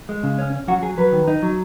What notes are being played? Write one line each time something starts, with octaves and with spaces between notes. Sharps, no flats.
G#3
C#3
C#4
C#4
F#3 F#4
F#3 G#4
F#3 B4
D#3
D#4
F#3